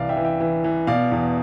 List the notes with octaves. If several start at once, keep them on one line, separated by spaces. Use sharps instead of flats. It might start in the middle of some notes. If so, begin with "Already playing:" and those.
Already playing: C2 E3 D5 F5
E5 G5
E3
E5 G5
E3
E3
B2 D5 F5
E2